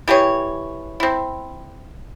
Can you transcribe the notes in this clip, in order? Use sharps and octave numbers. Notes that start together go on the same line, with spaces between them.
E3 G4 G#4 C#5
C4 E4